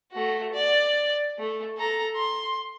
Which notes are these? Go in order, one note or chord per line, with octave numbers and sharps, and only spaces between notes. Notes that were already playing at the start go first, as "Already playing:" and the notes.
A3 F#4
D5
A3
A4 A#5
C6